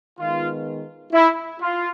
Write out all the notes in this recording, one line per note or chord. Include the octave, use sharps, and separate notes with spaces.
D#3 G#3 B3 F4
E4
F4